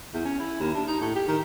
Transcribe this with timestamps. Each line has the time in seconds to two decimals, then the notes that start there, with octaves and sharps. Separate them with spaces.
0.14 E2
0.25 C#4
0.40 E4
0.60 D#2
0.75 D4
0.87 D#4
1.00 A2
1.16 G4
1.28 D#3